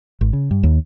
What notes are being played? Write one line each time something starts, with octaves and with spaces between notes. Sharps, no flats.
G#1
C#3
G2
D#2